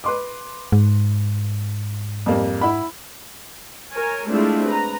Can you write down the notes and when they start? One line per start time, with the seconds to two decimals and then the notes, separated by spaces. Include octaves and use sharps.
0.04 B4 C6 D6
0.72 G#2
2.26 F2 G3 A#3
2.61 E4 F#5 B5
3.92 A#4 C#5 G#5
4.29 G#3 A3 C4 D4 E4 F4
4.67 B4 A#5